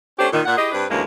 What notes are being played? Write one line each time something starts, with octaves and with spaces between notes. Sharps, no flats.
A3 C#4 D4 G4 C5
A#2 D#3
A#2 F#5
E4 G4 G#4 D#5
G2 C4 D4 B4
D2 G2 E3 G#3 A#3 C#4